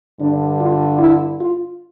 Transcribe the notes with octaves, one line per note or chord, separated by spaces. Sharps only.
G2 D3 D4
F4
E4
F4